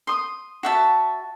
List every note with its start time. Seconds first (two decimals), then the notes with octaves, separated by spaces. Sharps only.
0.07 C6 D#6
0.63 F#4 E5 A5